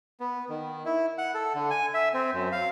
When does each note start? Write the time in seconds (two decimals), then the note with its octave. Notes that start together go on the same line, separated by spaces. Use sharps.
0.20 B3
0.49 D#3
0.86 E4
1.18 F#5
1.34 A4
1.55 D3
1.71 G#5
1.94 E5
2.14 C4
2.33 F#2
2.52 F5